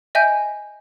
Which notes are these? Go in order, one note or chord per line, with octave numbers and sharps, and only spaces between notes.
D#5 E5 G5 G#5 G6